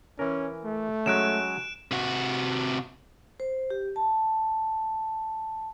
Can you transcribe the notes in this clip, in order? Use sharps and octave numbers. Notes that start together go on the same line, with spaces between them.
E3 C#4 A#4
A3
F#3 G#3 C#4 F#6 D7 E7
C3 F#4
C5
G4
A5